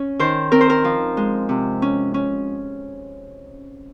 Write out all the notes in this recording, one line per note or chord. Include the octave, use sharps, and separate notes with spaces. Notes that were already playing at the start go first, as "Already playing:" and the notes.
Already playing: C#4
D#3 C5
C4 A#4
C5
A#4
F3
G#3
C3
C#4
C#4